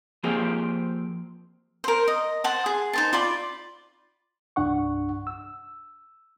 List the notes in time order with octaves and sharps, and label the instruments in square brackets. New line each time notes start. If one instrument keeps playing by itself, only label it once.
[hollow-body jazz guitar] F3 A#3 C4 G4 G#4
[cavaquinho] A#4 C5
D#5
C5 F#5 A5
G#4
D#4 C5 A5
F4 D5 B5
[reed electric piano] C2 G2 D4 F#5 C#6
E6